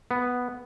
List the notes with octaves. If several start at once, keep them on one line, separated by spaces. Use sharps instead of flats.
B3